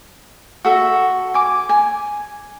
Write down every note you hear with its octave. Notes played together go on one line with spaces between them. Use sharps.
F#4 A4 E5
G#5 D6
G#5